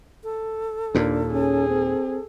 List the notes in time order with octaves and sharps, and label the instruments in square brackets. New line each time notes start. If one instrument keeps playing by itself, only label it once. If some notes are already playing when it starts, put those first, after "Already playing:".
[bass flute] A4
[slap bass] D#2 A#2 [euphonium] D4
[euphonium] C#4 [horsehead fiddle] G#4
[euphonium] C4